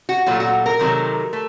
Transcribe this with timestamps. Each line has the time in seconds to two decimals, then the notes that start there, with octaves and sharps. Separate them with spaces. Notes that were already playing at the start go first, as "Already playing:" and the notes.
0.09 F#4
0.26 A#2 F#3 A3 F4
0.40 F#4
0.66 A#4
0.79 C3 D#3 F#3 A3
1.33 A3